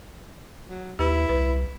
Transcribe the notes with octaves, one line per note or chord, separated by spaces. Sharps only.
F#3
D#2 E4 G4 B4
C2 B4